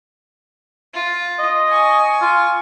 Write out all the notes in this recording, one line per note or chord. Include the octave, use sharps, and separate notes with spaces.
F4
D#5
G#5 C#6
F4